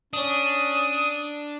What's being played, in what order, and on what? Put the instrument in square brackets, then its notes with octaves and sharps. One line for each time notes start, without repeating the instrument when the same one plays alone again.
[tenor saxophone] C#4 [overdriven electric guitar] D4 [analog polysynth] D#6